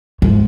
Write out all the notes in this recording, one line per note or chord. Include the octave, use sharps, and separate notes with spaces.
G#2